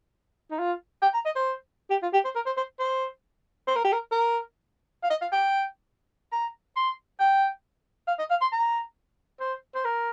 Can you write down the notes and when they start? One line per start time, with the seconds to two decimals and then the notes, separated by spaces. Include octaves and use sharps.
0.51 D#4
0.59 F4
1.02 G5
1.14 A#5
1.25 D#5
1.36 C5
1.91 G4
2.03 F4
2.13 G4
2.25 C5
2.35 A#4
2.46 C5
2.57 C5
2.79 C5
3.68 C5
3.75 A#4
3.85 G4
3.93 A#4
4.12 A#4
5.03 F5
5.10 D#5
5.21 F5
5.32 G5
6.33 A#5
6.76 C6
7.20 G5
8.08 F5
8.19 D#5
8.30 F5
8.42 C6
8.52 A#5
9.40 C5
9.75 C5
9.85 A#4